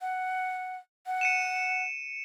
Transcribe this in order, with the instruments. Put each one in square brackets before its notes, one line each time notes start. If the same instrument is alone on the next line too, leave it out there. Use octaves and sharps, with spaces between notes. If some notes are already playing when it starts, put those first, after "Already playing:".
[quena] F#5
F#5
[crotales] C#7 D#7 E7